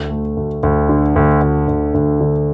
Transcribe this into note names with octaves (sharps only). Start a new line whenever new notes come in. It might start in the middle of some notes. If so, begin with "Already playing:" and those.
Already playing: D2
A3
D2
D2
D3
D2
D2
D2
D2
D3